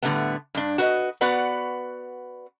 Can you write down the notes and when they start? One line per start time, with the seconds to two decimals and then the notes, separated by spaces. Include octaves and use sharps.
0.03 A2 D3 G3 A3 B3
0.55 G2 D4
0.78 F#4 B4 D#5
1.21 B3 F#4 B4 D5 F#5